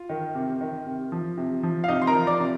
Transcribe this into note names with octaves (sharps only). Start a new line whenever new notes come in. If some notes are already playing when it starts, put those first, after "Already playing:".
Already playing: F4
D#3
C3
D#3
C3
F3
C3
F3
F5
C3 D#4 D#5
C6
A#4 A#5
F3
D5 D6
C3